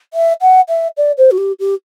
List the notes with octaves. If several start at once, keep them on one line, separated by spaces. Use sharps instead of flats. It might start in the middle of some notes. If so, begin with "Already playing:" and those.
E5
F#5
E5
D5
C5
F#4
G4
G4